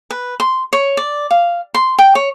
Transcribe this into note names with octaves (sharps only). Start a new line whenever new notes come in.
B4
C6
C#5
D5
F5
C6
G5
C#5